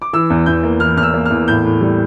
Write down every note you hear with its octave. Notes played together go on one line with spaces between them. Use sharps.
D6
E3 E6
E2
E2 G6
A#3
E3 F6
E2 F6
E6
A#3
E2 F6
A2 G6
A2
G3